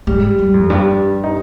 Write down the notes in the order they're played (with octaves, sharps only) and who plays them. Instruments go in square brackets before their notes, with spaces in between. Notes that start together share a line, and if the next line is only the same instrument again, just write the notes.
[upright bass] G#2 [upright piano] G3
[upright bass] G2
F2
G2
[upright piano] D#4